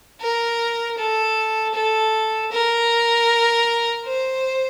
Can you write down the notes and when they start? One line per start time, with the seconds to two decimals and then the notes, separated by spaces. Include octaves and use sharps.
0.21 A#4
0.98 A4
1.74 A4
2.52 A#4
4.06 C5